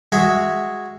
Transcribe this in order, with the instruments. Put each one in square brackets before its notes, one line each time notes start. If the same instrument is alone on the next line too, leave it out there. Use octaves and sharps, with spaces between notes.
[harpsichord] G#3 F#4 G#4 E5